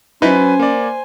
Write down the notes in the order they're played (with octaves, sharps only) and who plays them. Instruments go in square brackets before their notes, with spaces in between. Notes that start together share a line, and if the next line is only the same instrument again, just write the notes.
[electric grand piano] F#3 B4 [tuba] C#4 [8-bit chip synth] D#4 E4 [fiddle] C5 G#5
[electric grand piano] A#3 D5